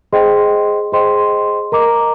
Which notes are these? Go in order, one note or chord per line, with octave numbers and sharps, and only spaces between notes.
G#4 C5 D#5 G5 C6
G#4 C5 D#5 G5 C6
A#4 D#5 A#5 D6